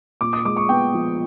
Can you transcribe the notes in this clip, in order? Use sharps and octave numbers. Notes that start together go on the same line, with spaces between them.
A#2 D6
D#6
G#3 D6
C#6
B3 G5
F3